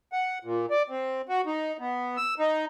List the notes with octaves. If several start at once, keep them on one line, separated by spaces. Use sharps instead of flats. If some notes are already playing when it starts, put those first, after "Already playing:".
F#5
A#2
D5
C4
F#4
D#4
B3
E6
D#4